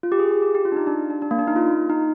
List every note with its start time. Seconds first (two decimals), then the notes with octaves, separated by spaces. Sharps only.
0.03 F4
0.12 G4
0.19 G#4
0.31 G4
0.42 G4
0.55 G4
0.65 F4
0.72 D4
0.76 D#4
0.87 D4
1.10 D4
1.22 D4
1.31 A#3
1.39 D4
1.47 D#4
1.56 F4
1.89 D#4